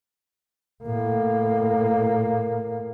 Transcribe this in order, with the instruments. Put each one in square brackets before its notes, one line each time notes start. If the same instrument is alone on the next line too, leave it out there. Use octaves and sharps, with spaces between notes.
[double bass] A2 A#3